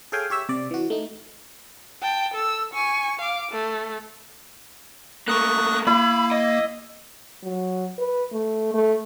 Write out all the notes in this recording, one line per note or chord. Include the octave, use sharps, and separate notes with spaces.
G#4 A4 C#5 F5 G5 G#5
G4 C#5 E5 E6
C3 D5
E3 F#4
A3 D#4
G5 A5
A4 E6
G#5 C#6
F5 D6
A3
A3 A#3 C#6 D#6 F#6
A#3 E4 B5
D#5
F#3
B4
A3
A3